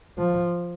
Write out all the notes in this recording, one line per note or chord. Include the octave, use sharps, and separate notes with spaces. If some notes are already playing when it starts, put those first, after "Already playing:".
F3